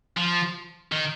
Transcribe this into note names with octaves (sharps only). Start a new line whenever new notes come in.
F3
D#3